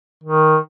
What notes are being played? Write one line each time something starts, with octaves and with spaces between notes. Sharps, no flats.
D#3